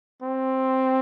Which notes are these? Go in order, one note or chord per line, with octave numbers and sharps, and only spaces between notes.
C4